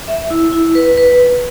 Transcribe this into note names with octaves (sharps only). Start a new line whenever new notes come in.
E5
E4
E4
B4
B4